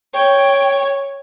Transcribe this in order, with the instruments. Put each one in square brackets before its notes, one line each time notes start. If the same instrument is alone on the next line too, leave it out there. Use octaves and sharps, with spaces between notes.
[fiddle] C#5 [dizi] G5